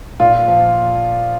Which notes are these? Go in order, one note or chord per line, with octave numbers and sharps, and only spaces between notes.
A#2 F4
F3